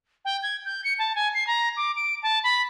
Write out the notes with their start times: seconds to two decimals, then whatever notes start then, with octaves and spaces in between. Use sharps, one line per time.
0.25 G5
0.43 G#6
0.65 G6
0.84 C#7
0.99 A5
1.15 G#5
1.34 C7
1.47 A#5
1.77 D6
1.96 D7
2.23 A5
2.44 B5